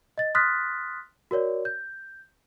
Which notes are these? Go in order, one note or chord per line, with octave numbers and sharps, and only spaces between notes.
D#5 A6
C6 D#6 F6 F#6 A6 B6
F#4 A#4 C#5 D5
G6